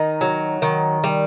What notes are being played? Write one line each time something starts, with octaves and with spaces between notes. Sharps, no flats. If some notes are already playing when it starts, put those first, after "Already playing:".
Already playing: D#3 D#4
F#3
D#3
G3